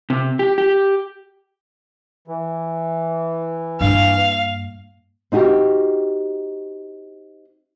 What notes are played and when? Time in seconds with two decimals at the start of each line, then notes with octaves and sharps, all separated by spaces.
0.10 C3
0.39 G4
0.58 G4
2.28 E3
3.81 G2 A#3 F5
5.32 C4 D#4 F#4 G4